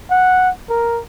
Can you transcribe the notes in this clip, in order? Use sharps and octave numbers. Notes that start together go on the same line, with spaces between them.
F#5
A#4